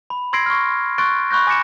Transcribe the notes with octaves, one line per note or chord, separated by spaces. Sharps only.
B5
C6 E6 G#6 A#6 C7 D7
C#6 F6
C6 C#6 F#6 A6 D7
B5 C#6 F#6 G6 A#6
G#5 D6 A#6 C#7 E7